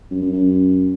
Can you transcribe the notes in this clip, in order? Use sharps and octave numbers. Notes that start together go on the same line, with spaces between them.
F#2
F#2
F#2